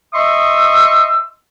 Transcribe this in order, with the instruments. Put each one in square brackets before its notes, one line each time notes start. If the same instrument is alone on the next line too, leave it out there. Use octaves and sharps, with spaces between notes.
[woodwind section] D#5 E5 C6 C#6 D#6 E6